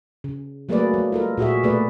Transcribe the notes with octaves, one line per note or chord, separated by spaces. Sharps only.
C#3
F#3 A3 A#3 G#4 B4 D5
G#3
F4 A4 A#4
A#2 F#4 G#4 E5
B2 A3 G#4 B4 D5